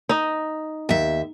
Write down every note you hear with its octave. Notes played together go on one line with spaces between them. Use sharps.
D#4 D#5
D#2 E5